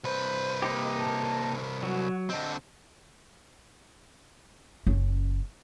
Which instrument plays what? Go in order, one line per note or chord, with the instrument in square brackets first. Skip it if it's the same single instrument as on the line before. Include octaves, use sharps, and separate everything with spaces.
[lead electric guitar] C2 B4 [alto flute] C5
[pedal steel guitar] A#3 D#4 G4
[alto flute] A5
[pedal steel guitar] F#3 [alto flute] F#4
[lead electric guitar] D3 C4 [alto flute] D#5
[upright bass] F#1 C#4